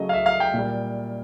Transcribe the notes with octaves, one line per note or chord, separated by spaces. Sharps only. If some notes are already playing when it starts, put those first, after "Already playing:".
Already playing: C#3 F#3 A3 D#5
F5
E5
F5
G5
A#2 G3